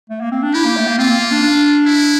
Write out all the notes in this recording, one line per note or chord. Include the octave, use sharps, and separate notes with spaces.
A3
A#3
C4
D4
E4 G4
A#3
A3
A#3
C4 F4
A#3
A#3
D4
D4
E4